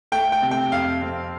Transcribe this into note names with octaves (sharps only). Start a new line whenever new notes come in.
A3 G5
G5
C3
G5
F2 F5
C4